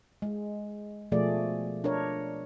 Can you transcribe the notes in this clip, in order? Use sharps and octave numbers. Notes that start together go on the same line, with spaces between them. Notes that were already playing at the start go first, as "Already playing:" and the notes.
G#3
B2 F3 A3 G#4 D5
D4 A#4 C#5